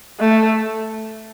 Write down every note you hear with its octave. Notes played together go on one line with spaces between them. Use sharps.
A3